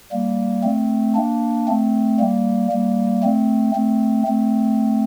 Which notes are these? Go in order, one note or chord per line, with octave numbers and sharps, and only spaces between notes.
G3 A#3
A3 C4
A#3 D4
A3 C4
G3 A#3
G3 A#3
A3 C4
A3 C4
A3 C4